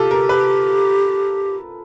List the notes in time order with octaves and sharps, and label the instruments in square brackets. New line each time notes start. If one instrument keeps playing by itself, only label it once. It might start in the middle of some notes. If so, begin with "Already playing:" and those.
Already playing: [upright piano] F4 A4 [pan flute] G4
[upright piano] A#4
B4